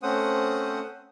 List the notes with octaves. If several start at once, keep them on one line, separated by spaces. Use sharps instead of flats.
A3 C4 C#4 C5 F#5 D#6